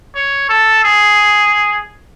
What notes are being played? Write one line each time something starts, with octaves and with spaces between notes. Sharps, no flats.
C#5
A4
G#4